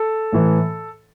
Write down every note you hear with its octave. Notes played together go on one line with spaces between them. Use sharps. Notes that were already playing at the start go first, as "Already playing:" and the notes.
Already playing: A4
A2 E3 A3